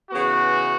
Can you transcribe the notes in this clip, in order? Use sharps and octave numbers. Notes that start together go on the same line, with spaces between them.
C#3 E3 B3 F#4